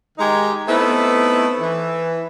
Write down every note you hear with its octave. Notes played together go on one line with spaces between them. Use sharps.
D#3 G#3 D#4 G4 G#5 A#5
A3 B3 C4 D#4 E4
E3